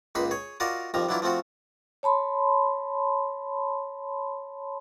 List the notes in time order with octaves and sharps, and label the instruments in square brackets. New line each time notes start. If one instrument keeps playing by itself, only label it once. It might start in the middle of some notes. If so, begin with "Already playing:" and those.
[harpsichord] C#2 A#2 D#4 B4 B5 C6
G#4 C#5
F4 F#4 A#4 D5 D#5 F5
F2 D#3 F3 G3 A#5
E3 F#3 D4 E4 F4
F3 A3 C4 F4 F#4
[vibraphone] C#5 A5 B5 C6